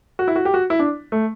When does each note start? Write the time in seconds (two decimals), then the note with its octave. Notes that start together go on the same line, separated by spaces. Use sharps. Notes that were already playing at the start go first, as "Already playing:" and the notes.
0.19 F#4
0.28 E4
0.36 F#4
0.45 G4
0.54 F#4
0.70 E4
0.79 D4
1.12 A3